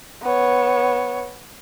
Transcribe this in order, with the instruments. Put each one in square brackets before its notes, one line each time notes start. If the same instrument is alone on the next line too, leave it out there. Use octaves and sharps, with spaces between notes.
[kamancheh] B3 C#5